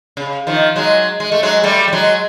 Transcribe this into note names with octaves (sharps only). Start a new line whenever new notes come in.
C#3
D#3 F3
F#3 G#3
G#3
A3
F#3 G#3
G3 A3
G3
F#3 G#3